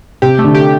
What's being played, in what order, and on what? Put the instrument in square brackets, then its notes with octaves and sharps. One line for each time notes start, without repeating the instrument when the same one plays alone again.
[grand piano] C3 [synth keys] G4
[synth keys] A3
[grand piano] D3
[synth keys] G4